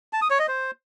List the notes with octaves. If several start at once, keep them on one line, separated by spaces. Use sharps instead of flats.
A5
D#6
C#5
D#5
C5